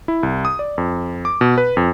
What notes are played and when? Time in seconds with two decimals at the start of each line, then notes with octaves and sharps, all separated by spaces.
0.08 E4
0.23 C2
0.45 D#6
0.59 D5
0.78 F2
1.25 D6
1.41 B2
1.58 B4
1.77 F2